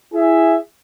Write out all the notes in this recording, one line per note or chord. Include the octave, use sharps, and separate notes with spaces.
E4 G#4 E5